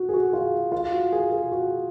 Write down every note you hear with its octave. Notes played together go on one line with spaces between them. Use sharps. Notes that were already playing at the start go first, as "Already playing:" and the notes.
Already playing: F#4
G#4
F#4
F4
F4
F#4
G#4
G#4
F#4